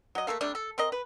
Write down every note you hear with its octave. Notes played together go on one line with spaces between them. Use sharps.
F#3 D#5
A3 A#3 A4 F5
C3 G3 A3 D4
A4
C4 A#4 D#5
B4